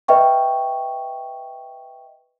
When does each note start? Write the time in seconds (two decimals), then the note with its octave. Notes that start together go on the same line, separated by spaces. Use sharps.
0.08 B4 D#5 E5 G5 C#6